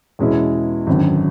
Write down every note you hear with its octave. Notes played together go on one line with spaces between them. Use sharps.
E2 B2 G#3 C#4 E4
G#1 F#2 D3